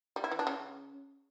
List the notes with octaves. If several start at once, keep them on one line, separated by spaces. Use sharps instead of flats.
G3
E4
E3
D4
C#3